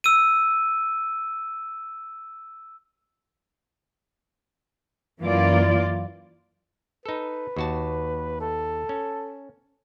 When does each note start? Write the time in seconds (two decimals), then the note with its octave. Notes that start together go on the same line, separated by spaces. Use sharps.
0.04 E6 D#7
5.21 F#2 E3 A#3 F4 D5
7.06 D#4 A4 B4
7.57 D#2 F#4 A5
8.40 A4
8.89 C#4